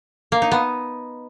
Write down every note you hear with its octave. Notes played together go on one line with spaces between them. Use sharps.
A#3
D#4
B3